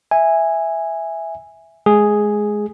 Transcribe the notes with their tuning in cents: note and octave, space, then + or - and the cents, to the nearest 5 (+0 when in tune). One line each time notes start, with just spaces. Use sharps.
E5 -5 G#5 -10
G#3 +20 G#4 +0